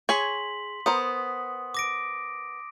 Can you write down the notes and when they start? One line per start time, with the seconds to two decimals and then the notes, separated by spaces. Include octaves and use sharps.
0.09 G#4 C#5 G#5 C6 B6 F#7
0.86 B3 A#4 C5 D#6
1.74 D6 A#6 D7